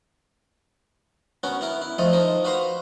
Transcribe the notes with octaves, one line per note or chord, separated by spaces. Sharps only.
B3 C#4 F#4 A#4
B3 E4 A#4
E4
F2 F3 A3 A4 D#5
F3 D#4 A#4 D#5
F#4 B4 C5 F5 A#5